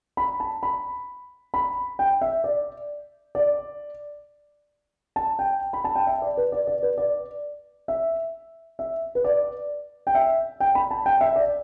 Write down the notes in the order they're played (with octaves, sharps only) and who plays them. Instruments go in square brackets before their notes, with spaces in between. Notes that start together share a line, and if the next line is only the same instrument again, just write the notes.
[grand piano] B5
A5
B5
B5
G5
E5
D5
D5
A5
G5
B5
A5
G5
E5
D5
B4
D5
D5
B4
D5
E5
E5
B4
D5
G5
E5
G5
B5
A5
G5
E5
D5